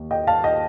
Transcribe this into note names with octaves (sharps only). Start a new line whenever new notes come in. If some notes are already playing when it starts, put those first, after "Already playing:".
Already playing: D#2
D#5 G5
F5 A5
D#5 G5